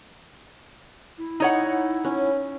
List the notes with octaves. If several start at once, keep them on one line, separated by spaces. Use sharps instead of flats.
E4
D#4 C#5 F#5
C#4